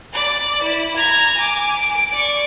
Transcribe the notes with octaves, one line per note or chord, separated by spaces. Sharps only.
D5
E4
A#5 G#6
G#5 D6
D7
D5 C#6